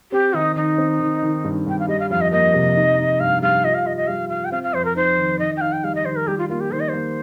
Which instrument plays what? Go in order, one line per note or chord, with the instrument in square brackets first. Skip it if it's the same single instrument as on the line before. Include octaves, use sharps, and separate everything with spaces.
[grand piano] C4 [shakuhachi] G4
[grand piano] D#3 [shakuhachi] D#4
[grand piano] D#3 [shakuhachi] D#4
[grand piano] C4
D#3
D#3
G2
[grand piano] G2 [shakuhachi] G5
[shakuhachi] F5
[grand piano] G3 [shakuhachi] D#5
[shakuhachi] F5
[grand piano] F2 [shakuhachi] F5
[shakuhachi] D#5
[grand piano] A#3 [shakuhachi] D#5
[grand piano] C3
D#4
D#4
[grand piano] G2 [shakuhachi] F5
[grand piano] G3 [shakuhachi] F5
[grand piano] F4 [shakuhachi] D#5
[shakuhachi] F5
[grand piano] F4 [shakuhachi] D#5
[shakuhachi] D#5
[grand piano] G3 [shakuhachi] F5
[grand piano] F4 [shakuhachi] F5
[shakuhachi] G5
[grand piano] C4 [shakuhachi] F5
[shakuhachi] F5
[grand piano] F2 [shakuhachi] C5
[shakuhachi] A#4
[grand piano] D#4 [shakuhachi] C5
[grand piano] D#3
[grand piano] D#3 [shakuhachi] D#5
[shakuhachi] G5
[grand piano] D#4 [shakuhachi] F5
[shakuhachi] G5
[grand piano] G3 [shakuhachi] F5
[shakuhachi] D#5
[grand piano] D#3 [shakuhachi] C5
[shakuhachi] A#4
[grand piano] G3 [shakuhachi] G4
[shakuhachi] F4
[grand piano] A#3 [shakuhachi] F4
[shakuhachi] G4
[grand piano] D#3 [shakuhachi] C5
[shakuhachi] D#5
[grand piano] A#3 [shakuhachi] C5